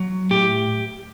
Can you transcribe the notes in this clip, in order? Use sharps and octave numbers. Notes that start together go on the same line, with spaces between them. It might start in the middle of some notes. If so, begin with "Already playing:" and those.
Already playing: F#3
A2 G4